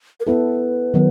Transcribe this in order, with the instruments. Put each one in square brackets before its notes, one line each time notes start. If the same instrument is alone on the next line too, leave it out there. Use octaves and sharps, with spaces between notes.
[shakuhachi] A#4
[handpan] B3 E4 A4 [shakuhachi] B4
[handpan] D#3 F#3 B3